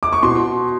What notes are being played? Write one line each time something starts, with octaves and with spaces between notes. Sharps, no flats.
D6
C#6
B2 C6